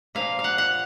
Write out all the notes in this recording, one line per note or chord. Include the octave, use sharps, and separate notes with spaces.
A#2 F3 A#3 F5
F5
F#5
F#5